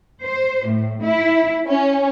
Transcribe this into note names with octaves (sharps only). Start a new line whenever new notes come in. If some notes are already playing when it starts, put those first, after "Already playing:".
C5
A2
E4
C#4